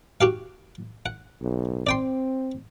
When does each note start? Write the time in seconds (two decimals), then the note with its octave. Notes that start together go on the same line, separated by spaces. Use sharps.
0.21 F#4 G4 F5
1.06 F#5
1.42 B1
1.87 C4 D5 G5 C6